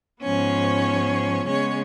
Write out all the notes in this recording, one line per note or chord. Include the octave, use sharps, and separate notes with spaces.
G#2 F3 B3 C#4 C#5
C#3 G#3 B3 C#4 C#5